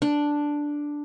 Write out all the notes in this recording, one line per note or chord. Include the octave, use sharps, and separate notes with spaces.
D4